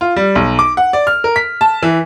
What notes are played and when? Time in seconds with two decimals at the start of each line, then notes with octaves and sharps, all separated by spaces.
0.01 F4
0.16 G3
0.35 B1
0.59 D6
0.77 F#5
0.93 D5
1.07 F6
1.24 A#4
1.36 B6
1.61 A5
1.83 E3